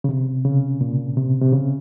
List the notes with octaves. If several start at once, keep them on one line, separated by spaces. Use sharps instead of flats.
C#3
C3
C#3
A#2
C3
C3
C#3